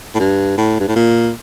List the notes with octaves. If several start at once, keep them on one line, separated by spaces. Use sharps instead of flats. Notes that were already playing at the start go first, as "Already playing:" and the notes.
A2
G2
A2
G2
A2
A#2